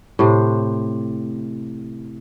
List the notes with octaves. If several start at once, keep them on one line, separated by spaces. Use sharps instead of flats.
A2 C3 C5